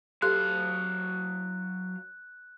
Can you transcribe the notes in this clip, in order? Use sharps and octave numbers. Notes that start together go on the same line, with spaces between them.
F#3 G4 A4 F5 C6 F#6